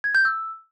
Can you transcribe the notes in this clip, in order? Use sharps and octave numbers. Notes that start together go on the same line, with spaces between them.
G#6
G6
E6